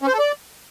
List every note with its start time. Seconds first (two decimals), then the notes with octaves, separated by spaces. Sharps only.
0.02 C#4
0.08 C5
0.13 A4
0.19 D5